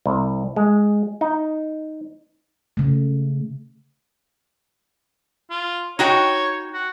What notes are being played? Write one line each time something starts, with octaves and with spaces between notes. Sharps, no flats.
C2
G#3
D#4
C#3 A3
F4
D#4 F#4 C#5 G5
F#4